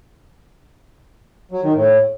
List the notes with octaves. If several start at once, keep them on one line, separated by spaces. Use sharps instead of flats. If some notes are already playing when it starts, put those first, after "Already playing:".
F#3
D#3
A2